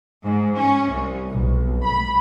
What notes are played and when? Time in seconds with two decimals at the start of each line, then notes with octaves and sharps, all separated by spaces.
0.24 G#2
0.57 C#4
0.91 C2
1.30 B1
1.85 B5